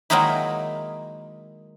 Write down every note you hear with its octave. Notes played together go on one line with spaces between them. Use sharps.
D#3 F#3 G#3 A#3 D#4 E4